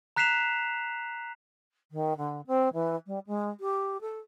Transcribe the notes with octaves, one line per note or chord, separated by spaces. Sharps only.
A#5 F#6 B6 C7 E7 F7
D#3
D3
C4
E3
G3
G#3
G4
A4